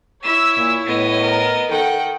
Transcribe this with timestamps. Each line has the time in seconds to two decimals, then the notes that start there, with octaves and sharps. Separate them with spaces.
0.23 E4 C#5 E5 E6
0.57 A#2
0.86 A2 B3 D#5
1.21 A#4
1.70 D#3 A4 F#5 G5